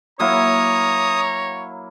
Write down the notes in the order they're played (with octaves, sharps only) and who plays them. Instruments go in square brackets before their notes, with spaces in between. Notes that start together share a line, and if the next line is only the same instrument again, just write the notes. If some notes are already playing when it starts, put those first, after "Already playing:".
[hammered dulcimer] F#3 A#3 E4 [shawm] C#5 [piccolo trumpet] A#5 [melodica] D#6